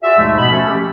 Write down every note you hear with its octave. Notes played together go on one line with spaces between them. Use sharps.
F4 F#4 G#4 D5 E5
D#2 G#2 B2 F3 G#3 A3
B2 B3 B5
F3 A3 C#4 A4
G4